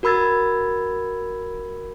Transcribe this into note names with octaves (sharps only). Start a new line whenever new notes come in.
F#4 A#4 B5 E6 G#6 A6